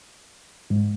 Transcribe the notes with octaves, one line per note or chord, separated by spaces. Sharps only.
G#2